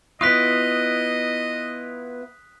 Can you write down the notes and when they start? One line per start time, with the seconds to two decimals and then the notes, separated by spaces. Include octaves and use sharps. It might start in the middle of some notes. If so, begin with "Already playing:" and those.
0.21 B3 E4 F4 D#5 D#6 F#6 B6